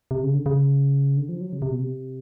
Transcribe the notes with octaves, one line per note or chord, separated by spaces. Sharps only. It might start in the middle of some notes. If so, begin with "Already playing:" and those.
C3
C#3
D3
C#3
D3
F3
F#3
C#3
C3
B2
C3